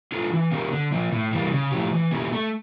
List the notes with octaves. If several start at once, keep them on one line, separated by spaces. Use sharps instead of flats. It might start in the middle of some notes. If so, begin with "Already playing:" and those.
D4 F4 A4
E3
A#3 C#4 G4 A#4
D3
F3 A#3
A2
E3 G3 A#3
C#3
F3 A3 E4 G4
E3
A#3 C#4 E4 G4
A3